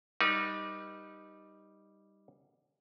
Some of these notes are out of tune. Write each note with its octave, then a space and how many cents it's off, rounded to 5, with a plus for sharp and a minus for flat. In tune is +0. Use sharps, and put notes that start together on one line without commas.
G3 +0 D#4 +0 B4 -45